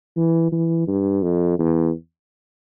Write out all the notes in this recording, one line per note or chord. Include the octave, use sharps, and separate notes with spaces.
E3
E3
G2
F2
E2